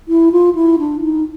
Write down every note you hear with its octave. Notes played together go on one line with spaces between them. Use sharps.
E4
F4
E4
D4
D#4